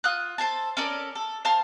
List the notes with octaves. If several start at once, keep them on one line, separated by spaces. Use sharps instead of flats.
F4 D#6 F#6
A4 C5 G#5 A5
C#4 A4 A#4 D5
A4
C5 F5 A5 F6